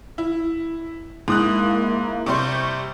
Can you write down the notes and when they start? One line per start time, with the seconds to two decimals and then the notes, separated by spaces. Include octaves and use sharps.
0.18 E4
1.28 G#2 A#3 E4 D#6 F#6
2.26 C3 G3 C6 C#6 G6